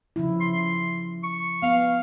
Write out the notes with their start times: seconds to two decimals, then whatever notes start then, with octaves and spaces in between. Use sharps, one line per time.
0.16 C#3 F3 E4
0.41 C6
1.24 C#6
1.63 B3 F5